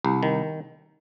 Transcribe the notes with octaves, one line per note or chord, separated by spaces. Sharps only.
C2
D#3